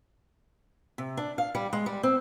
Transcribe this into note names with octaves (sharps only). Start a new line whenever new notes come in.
C3
D4
F5
G3
G#3
G3
C4